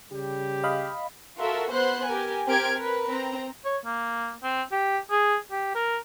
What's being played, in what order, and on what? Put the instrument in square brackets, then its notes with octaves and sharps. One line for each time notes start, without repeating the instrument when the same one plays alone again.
[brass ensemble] C#3 G3 G4
[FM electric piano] D#5 F5 B5
[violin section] F4 F#4 A4 A#4 E5
B3 C5 C6 F#6
G4 A#4 G#5
C4 G4 A#4 F6 G#6 D7
A#4 B4
C4 A#5
[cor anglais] C#5
A#3
C4
G4
G#4
G4
A#4